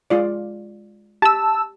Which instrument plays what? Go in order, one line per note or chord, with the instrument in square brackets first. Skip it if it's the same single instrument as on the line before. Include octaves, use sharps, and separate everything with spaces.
[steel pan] G#3 F4 D5
[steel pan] G4 [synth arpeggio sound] A5 E6